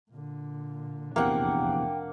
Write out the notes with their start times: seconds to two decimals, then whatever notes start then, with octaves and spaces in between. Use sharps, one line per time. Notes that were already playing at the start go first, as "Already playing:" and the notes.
0.11 A#2 D3
1.16 F1 A#1 E2 C3 A#3 D4 F#5 G5